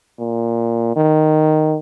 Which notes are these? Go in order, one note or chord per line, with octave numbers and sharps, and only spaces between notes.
A#2
D#3